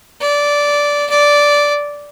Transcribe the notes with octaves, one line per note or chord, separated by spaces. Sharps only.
D5
D5